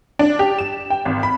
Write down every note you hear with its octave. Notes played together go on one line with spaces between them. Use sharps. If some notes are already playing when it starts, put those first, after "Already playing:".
D4
G4
E7
G5
G#1
B5